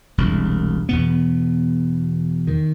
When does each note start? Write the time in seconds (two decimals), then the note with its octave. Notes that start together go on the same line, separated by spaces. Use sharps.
0.18 E1 C2
0.89 E2 B2 B3
2.47 D#3